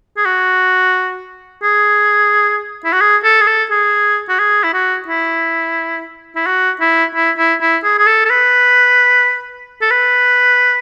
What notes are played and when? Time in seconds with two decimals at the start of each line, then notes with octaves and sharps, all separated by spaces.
0.17 G#4
0.26 F#4
1.63 G#4
2.85 E4
2.93 F#4
3.01 G#4
3.24 A4
3.41 G#4
3.47 A4
3.71 G#4
4.29 F#4
4.39 G#4
4.64 E4
4.74 F#4
5.08 E4
6.36 E4
6.46 F#4
6.81 E4
7.15 E4
7.38 E4
7.61 E4
7.84 G#4
7.99 G#4
8.07 A4
8.26 A4
8.30 B4
9.82 A4
9.91 B4